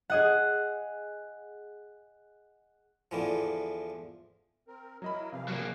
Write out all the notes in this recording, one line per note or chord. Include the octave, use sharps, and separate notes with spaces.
G#4 D#5 F#5
E2 D3 E3 F3
C4 A#4
F#3 E4 A#4 D#5 B5
C3 E3 F3 F5
F#3 A#3